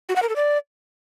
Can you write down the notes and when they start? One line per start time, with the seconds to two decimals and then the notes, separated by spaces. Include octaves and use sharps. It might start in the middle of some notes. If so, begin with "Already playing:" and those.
0.09 F#4
0.16 F#5
0.22 A#4
0.29 A4
0.36 D5